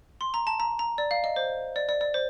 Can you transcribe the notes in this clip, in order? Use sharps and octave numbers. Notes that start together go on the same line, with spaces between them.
C6
A#5
A5
A#5
A#5
D5
F5
D#5
C5
D5
D5
D5
C5